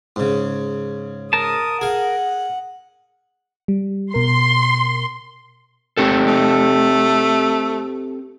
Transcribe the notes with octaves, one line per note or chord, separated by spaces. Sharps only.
G#2 C#3
A#4 A5 D#6
G#4 F5 F#5
G3
B2 A#4 C6
C4 G4 A4
A3